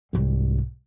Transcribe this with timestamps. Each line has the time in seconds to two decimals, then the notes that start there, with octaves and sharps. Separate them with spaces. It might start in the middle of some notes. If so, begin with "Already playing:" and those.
0.13 C2 G#2